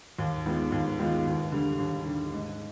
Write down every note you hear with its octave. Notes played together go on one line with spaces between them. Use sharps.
D#2
D#3 G#3 B3 F4
D#2
D#3 G#3 B3 F4
D#2
D3 G3
D#2
D3 G3
G#2